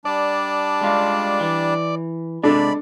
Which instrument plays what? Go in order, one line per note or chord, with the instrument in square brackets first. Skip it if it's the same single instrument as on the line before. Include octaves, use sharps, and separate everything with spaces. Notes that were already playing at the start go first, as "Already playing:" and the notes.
[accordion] G3 D4 A5 [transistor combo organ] D5
[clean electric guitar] G#3 F4
E3
[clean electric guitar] C3 G#3 [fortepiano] D4 A4 [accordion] D5 B5